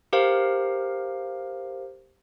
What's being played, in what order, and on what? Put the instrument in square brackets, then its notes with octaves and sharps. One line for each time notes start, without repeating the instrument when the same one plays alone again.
[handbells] G4 A#4 C5 F5